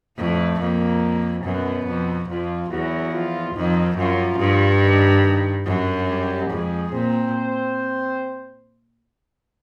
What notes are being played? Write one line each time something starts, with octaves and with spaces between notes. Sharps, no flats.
F2 A2 A3
F2 A#2 A#3
F#2 B2 B3
F2
F2 F3 F4
E2 F#3 F#4
F3 F4
F2 D#3 D#4
F#2 F3 F4
G2
D#3 D#4
F#2 F#3 F#4
G3 G4
F2 G#3 G#4
A#2 C4 C5